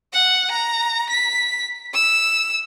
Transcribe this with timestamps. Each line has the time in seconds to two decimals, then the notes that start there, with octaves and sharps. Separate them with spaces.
0.13 F#5
0.51 A#5
1.10 B6
1.94 E6